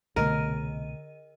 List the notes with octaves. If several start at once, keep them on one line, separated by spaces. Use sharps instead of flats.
C2 B2 D3 A3 A#4 D#5 D#7